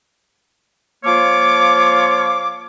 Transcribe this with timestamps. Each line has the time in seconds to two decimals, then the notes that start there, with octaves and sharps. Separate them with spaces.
1.04 F3 A#3 F4 C#5 F5 D6